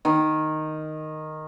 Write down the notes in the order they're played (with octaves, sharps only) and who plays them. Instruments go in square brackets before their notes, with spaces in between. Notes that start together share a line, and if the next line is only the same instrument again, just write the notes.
[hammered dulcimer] D#3